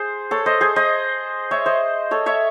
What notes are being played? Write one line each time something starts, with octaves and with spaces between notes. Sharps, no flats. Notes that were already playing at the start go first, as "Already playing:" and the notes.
Already playing: G#4 C5
A4 C#5
C5 D#5
G#4 C5
C5 D#5
C#5 E5
C5 D#5
A4 C#5
C#5 E5